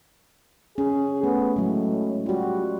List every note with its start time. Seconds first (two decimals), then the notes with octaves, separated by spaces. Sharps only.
0.78 C#4 G#4
1.23 A3 B3
1.56 A2 F#3 G#3
2.26 G3 F4 F#4